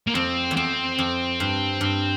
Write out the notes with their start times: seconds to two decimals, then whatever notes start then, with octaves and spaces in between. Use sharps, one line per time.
0.07 A#3
0.15 F2 C4
0.51 E2
0.56 F2 C4
0.99 F2
1.40 G2
1.81 G2